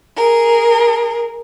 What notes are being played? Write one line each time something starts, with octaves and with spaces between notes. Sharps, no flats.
G#4 A#4